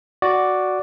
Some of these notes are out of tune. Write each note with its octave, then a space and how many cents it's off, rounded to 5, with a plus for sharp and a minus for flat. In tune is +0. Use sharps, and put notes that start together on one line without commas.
F#4 +0 D5 +0